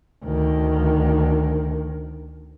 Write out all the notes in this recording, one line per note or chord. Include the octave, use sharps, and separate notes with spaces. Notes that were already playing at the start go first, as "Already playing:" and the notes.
D2 D#3